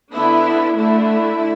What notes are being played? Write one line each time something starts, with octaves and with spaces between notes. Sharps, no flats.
D3 B3 D4 E4
D3 A3 D4 E4